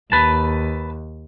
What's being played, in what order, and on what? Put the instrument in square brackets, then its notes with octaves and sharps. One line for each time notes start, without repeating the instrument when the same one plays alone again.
[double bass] D#2 [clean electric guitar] B4 A5